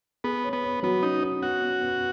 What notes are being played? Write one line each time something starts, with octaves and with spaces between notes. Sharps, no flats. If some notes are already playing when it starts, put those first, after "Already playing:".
B3 G#4
C#5
B3
C#5
F#3 B3
C#4 D#4
C#4
B3 F#4
B3
B3